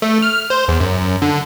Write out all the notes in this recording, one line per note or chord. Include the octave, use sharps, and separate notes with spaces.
A3
F6
C5
E2
F#2
D3